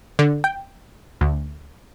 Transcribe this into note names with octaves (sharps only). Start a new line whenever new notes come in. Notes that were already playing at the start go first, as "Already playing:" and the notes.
D3
G5
D2